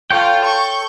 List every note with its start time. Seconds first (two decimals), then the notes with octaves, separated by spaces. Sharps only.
0.11 F4 A4 C#5 G5
0.41 C#6 G6